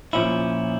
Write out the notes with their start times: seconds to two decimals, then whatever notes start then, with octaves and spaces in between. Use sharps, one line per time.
0.13 A#2 F3 C#4 E4